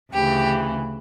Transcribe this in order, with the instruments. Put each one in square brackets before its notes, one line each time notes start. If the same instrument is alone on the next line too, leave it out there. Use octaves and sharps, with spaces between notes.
[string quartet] D2 C#3 E3 G4